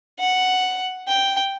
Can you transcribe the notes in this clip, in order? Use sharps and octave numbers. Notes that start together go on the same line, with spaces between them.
F#5
G5